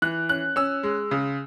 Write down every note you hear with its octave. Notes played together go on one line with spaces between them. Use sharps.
E3 F#6
C#4 F#6
C#4 E6
G#3
C#3